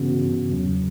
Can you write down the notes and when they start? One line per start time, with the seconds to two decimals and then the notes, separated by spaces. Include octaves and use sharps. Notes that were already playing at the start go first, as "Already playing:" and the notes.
Already playing: G2 C#3 E3 B3 F#4
0.52 E2 C#3 F#3 C#4